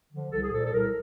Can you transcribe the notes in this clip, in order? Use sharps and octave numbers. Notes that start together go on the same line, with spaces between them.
D3 F3
C2 A4
G#4
A#2 F3 A4
A4
C2 A#4